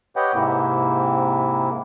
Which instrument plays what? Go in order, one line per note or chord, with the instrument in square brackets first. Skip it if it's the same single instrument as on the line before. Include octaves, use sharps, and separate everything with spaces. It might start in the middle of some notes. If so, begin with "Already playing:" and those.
[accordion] G4 B4 C#5 D#5 F#5 G5
G#2 C3 A#3 C4 E4